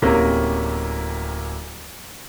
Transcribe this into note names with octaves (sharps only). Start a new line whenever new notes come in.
D1 C3 A#3 C#4 A#4